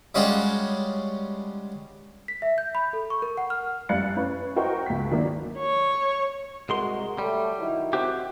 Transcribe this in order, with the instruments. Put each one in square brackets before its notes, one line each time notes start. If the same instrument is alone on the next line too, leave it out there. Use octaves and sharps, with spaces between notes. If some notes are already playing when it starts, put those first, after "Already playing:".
[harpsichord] G3 G#3 C#4 F4 F#4 G#4
[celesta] B6
E5
G6
B5
A4
C#6
A#4
F#5
F6
[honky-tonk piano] F#2 G3 F5 F#6 A6 C#7
C#4 B4
F#4 A#4 C5 D#5 G5 C#6
C#2 B6
D#3 F#3 A#3 D4
[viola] C#5
[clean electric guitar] C2 G#3 C6 [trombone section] F#4 A#4
[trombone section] F#3 A3 [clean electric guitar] G3
[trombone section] D#3 F#3 E4
[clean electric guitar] C4 F#4 G4